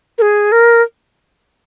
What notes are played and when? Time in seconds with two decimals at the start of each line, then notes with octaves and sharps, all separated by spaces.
0.18 A#4
0.22 G#4
0.52 A#4